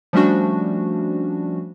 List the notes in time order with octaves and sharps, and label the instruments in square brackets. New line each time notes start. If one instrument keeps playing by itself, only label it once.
[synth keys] F3 G3 A3 C#4 D4 F#4